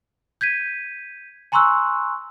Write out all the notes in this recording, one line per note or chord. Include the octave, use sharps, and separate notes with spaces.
G6 G#6 B6 D#7
G#5 A#5 C6 C#6 E6 F#6